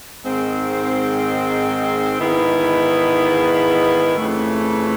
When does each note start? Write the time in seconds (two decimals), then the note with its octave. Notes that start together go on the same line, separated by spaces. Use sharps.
0.23 G#2 D#3 G#3 C4
2.20 G#2 D#3 G#3 B3 E4
4.17 F2 C#3 E3 A3